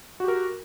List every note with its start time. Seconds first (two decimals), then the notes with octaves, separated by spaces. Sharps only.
0.20 F#4
0.24 G4
0.28 A#4